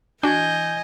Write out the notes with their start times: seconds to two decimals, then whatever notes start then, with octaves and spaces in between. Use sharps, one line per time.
0.23 E3 D4 F#4 D#5 G#5 G6 G#6